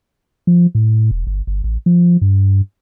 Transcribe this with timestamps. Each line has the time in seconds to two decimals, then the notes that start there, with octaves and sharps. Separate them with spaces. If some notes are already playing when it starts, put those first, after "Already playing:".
0.47 F3
0.75 A2
1.11 E1
1.27 G1
1.47 G1
1.64 A1
1.86 F3
2.21 G2